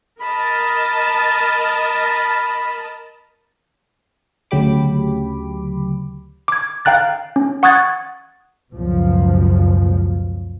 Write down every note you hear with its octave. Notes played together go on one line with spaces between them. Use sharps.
A#4 D#5 A5 B5
D2 C#3 F#3 G4 B5 D6
D6 G#6
F5 G5 A#5 F#6 A6
C#4
F#5 C#6 D#6 F#6 G#6 A6
C#2 F#2 B2 F3